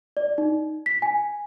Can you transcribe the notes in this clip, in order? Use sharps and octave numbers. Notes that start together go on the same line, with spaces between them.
D5
D#4
B6
G#5